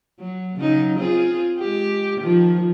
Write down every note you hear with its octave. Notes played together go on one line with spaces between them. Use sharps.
F#3
C#3 F#3 D#4
C4 F4 G#4
G#3 G4
D#3 F3 F4